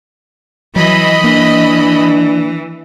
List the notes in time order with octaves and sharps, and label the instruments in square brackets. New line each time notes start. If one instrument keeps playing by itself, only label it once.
[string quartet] E3 [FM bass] F#3 [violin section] D#5 B5
[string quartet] E3 [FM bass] A#3 [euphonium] D4